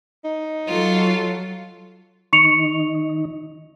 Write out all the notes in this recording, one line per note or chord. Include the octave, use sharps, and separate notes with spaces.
D#4
F#3 F4 A4
D#3 D#4 C#6 C#7 F7